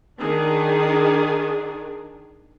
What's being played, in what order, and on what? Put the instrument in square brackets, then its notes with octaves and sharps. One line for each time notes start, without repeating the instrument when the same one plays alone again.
[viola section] D#3 D4 G#4